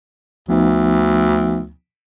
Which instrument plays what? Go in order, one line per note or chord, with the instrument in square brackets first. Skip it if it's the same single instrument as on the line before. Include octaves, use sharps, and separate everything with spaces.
[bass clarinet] D2 [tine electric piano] F3 B3 D#4